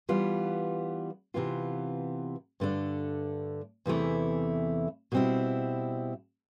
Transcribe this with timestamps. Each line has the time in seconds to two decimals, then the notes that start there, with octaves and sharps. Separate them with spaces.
0.09 E3 G3 B3 F4
1.34 C3 E3 B3 F4
2.60 G2 D3 A3 D4
3.86 E2 C3 E3 A3 E4
5.12 B2 G3 C4 E4